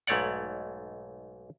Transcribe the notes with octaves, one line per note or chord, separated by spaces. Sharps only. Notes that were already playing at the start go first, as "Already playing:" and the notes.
B1 G#2 A3 C#5 D5 F#5